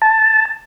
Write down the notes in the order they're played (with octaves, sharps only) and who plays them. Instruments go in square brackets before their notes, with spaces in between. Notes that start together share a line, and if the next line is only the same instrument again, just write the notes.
[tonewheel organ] A5